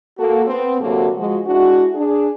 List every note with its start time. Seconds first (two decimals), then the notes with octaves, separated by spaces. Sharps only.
0.18 A#3 F#4 A4
0.47 B3 C4
0.80 D2 C3 F#3 A#3 F#4 A4
1.16 F3 G#3 F#4
1.45 G#3 D4 E4 F#4
1.94 D4 G#4